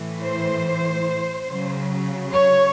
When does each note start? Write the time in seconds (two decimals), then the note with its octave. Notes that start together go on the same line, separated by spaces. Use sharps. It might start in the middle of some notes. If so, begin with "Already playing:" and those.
Already playing: A2 E3
0.22 C5
1.49 C#3 F#3
2.33 C#5